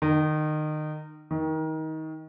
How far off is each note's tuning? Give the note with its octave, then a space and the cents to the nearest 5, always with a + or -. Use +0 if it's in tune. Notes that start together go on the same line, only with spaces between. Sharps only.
D#3 -25
D#3 +25